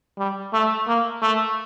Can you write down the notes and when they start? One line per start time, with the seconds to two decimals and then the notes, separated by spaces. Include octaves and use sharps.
0.18 G3
0.53 A3
0.88 A#3
1.22 A3